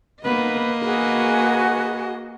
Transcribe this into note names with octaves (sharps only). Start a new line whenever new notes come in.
A#3 B3 B4 D#5
F#4 G#4 B4